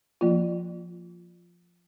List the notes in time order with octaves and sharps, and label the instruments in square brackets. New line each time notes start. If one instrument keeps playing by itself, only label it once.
[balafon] F3 A#3 F4